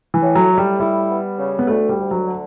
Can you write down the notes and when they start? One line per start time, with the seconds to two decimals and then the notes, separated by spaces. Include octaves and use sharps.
0.14 E3
0.22 A2
0.35 F#3
0.51 A2
0.58 G3
0.80 G3 E4
1.09 B3
1.38 C#3
1.59 B3
1.67 D2 A3
1.89 G3
1.97 D2
2.11 F#3
2.26 D3